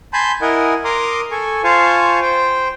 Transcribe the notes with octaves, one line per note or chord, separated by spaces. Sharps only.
G#5 A5 B5 C6 G6
E4 A#4 D#5 F#5 G#5
A#4 A#5 C6 D6 D#6
A4 G#5 C#6
F4 C5 F5 G#5 A5 C#6
C5 G5